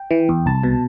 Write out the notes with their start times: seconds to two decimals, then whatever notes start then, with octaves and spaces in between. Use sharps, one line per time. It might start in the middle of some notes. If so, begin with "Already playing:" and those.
Already playing: G5
0.11 E3
0.29 E2
0.46 C2 A5
0.63 B2